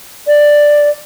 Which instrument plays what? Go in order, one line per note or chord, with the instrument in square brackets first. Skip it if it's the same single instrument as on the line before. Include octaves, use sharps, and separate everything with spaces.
[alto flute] D5